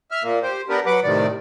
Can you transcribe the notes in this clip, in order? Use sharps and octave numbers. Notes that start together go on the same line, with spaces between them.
E5 F6
A#2 A#3
G4 C5
B3 D4 G4 A#4 B4
F#3 B4 F#5 D6
A2 C3 D#3 D5